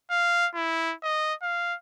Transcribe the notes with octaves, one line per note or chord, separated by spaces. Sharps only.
F5
E4
D#5
F5